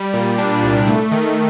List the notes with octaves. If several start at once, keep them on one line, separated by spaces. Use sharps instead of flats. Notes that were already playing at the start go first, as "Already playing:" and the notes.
Already playing: G3
A#2
D4
C2
A3
D#3